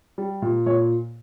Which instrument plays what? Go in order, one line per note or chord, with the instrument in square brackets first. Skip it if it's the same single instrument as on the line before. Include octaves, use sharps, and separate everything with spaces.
[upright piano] G3
A#2
A#2 C#5